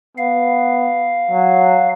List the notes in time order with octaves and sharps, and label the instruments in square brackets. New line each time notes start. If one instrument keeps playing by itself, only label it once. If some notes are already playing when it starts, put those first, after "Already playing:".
[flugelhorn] B3 [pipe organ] F5
[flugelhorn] F#3